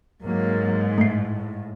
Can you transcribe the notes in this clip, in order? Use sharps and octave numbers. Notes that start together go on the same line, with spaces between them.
G#2 F#3 A#3
A2 A3 C7